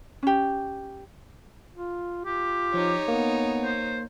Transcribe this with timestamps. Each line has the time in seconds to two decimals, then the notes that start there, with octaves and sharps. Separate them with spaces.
0.23 C#4 G4
1.75 F4
2.25 F4 G4
2.74 F3 D#4 C#5
3.08 A#3 B3
3.63 C5